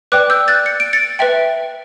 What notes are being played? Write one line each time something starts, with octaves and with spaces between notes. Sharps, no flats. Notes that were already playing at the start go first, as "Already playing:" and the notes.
B4 D5 G5 D6 F#6
E6 G6
F#6 A6
C#7
D7
A6 C#7
B4 E5 G5